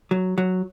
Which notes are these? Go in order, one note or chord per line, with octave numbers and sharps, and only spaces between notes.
F#3
F#3